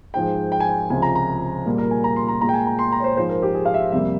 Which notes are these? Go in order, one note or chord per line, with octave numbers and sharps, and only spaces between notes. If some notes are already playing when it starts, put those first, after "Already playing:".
G#2 F3 G#3 G5
G5
G#5
G5
C#2 C3 F3 G#5
A#5
A#5
A#2 G3 A#3
A#4
G#5
A#5
C6
A#5
A#2 G#3 A#5
G5
G#5
A#5
C6
A#5
C#5
C5
G#2 F3 G#3 C5
A#4
G4
G#4
F5
E5
F2 C3 G3 A#3 E5